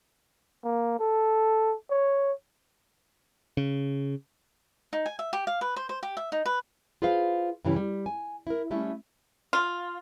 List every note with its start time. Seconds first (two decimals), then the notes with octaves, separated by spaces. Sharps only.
0.64 A#3
1.00 A4
1.90 C#5
3.57 C#3
4.93 D#4
5.06 G#5
5.19 E5
5.33 G4
5.47 F5
5.61 B4
5.76 C5
5.89 C5
6.03 G4
6.17 E5
6.32 D#4
6.46 B4
7.02 F4 G#4 B4 C5 F5
7.65 G2 C#3 E3 C#4 G4
7.76 G3
8.06 G#5
8.47 E4 A#4
8.71 G3 A3 C#4 E4
9.53 F4